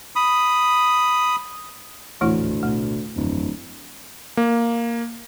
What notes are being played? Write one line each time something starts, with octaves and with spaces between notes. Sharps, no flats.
B5 D#6
D#1 A1 D2 E3 A3 E4
A1 B2 E3 A3
D1 G1 F2 E3
A#3